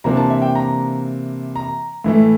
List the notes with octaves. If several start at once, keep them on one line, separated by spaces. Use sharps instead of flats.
C3 E3 A#3 D4 A#5
A5
E5
G5
A#5
A#5
A2 E3 A3